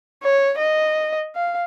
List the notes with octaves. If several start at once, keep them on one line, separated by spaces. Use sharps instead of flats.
C#5
D#5
F5